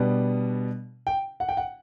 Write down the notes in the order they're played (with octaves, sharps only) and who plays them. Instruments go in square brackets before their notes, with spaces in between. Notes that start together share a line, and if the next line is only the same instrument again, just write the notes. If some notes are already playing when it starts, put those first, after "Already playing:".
Already playing: [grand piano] B2 G3 B3 D4
G5
F#5
G5
F#5